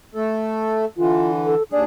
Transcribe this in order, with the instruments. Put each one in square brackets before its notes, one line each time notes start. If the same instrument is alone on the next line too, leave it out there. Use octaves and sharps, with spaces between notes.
[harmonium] A3 A4
[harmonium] D3 E3 [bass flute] F4
[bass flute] A4
[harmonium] D#2 D4 G#4 [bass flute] D5